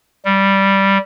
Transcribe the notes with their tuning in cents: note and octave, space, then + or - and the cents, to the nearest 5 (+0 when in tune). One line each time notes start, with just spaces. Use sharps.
G3 -5